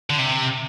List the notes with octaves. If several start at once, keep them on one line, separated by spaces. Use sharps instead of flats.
D3
C3